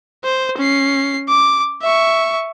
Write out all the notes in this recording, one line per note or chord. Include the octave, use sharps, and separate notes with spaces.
C5
C#4 C7
D6
E5 C#6